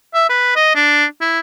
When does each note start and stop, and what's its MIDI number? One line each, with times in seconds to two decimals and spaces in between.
0.14 0.26 76
0.30 0.54 71
0.56 0.75 75
0.75 1.06 62
1.21 1.40 64